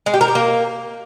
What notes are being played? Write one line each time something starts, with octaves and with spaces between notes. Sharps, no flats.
G#3
G4
A#4
G4
A#3